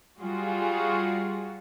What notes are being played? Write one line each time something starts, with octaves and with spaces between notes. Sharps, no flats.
G3 F4 F#4 G#4